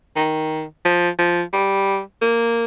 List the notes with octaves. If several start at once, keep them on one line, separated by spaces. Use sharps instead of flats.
D#3
F3
F3
G3
A#3